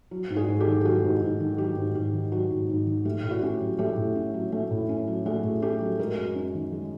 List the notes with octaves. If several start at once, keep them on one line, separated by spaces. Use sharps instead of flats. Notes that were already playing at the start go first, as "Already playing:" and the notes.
F#3
G#2
F#4 G#4
G#2
G4 A4
D#3
G4
F#3 F#4 G#4
G#2
G#2
D#3
F#3 G4
G#2
G#2 G4
D#3
F#3 F#4
G#2
G#2
D#3
A3 G4
A2
F#4
C#4 G4
F#3
A3 G4 A4
A2
C#4
F#3
A3
A2
C#4
F#3
A3 F#4 G#4
A2
C#4 G4 A4
F#3
G#3 G#4 A#4
F#2
C#4
D#3
G#3